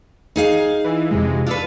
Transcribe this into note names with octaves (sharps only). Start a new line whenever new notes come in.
D#4 G#4 F5
E3
F2 C3 G#3
D4 F4 A4 B4